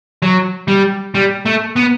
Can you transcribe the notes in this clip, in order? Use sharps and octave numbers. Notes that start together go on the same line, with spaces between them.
F#3
G3
G3
A3
B3